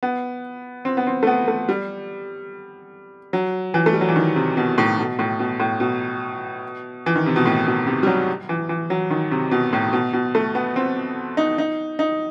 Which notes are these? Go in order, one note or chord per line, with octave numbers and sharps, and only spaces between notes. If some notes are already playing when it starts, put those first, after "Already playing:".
B3
C4
B3
C4
A3
B3
A3
G3
F#3
E3
A3
G3
F#3
E3
D#3
C3
B2
A2
B2
A2
B2
A2
B2
E3
D#3
C3
B2
A2
B2
C3
G3
F#3
E3
E3
F#3
D#3
C3
B2
A2
B2
B2
A3
B3
C4
D#4
D#4
D#4